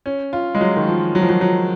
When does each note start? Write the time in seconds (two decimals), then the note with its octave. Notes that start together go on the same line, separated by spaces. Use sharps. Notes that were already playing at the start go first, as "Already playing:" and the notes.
0.06 C#4
0.33 F4
0.55 G#3
0.61 F#3
0.77 D#3
0.87 F3
1.15 F#3
1.22 F3
1.29 F#3
1.41 F#3